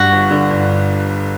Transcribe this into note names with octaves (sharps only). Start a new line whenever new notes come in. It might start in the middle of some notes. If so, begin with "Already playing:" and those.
Already playing: G2 F#4
G1
D3
G1